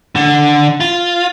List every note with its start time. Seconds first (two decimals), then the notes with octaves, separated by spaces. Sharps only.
0.16 D3
0.80 F4